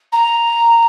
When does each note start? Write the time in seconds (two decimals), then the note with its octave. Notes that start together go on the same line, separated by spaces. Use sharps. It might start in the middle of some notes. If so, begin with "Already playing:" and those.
0.12 A#5